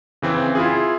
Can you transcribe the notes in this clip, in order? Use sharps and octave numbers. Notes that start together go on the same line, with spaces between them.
C#3 E3 C4
E4 F4 G#4